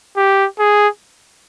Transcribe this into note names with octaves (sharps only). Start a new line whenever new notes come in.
G4
G#4